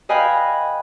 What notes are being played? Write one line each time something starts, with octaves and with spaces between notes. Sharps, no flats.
B4 D#5 F5 G5 G#5 B5